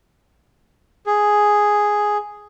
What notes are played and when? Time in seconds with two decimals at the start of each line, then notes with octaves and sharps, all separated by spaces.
1.06 G#4